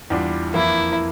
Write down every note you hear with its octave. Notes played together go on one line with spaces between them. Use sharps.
E2 E3 G3 D4 F4
F2 E3 A#3 E4